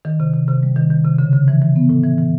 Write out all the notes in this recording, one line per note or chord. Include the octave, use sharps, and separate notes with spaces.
D#3
C3
C3
C3
G3
D#3
D#3
C3
C#3
C#3
E3
E3
B3
A2
E3
E3